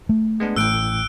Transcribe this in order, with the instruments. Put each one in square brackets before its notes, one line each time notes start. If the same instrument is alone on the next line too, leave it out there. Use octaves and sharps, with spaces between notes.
[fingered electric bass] A3
[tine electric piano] G#3 B3 D4
[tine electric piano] A1 A2 G5 [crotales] E6 F#6 D7